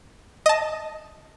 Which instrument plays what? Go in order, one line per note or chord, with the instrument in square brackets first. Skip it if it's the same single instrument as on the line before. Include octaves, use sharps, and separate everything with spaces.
[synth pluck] D#5 A5